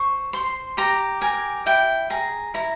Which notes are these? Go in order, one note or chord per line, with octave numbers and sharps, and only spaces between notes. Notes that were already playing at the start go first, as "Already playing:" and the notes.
Already playing: C5 C#6
C5 C6
G4 A#5
A#4 G#5
E4 G5
G#4 A#5
E4 A#5